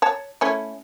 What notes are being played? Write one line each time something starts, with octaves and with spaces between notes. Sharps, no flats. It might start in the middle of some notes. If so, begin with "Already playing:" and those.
C#5 A5
A3 C#4 E4